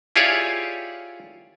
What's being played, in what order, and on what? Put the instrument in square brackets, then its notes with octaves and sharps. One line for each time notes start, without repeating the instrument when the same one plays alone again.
[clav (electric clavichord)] E4 F4 G4 G#4 C#5 D5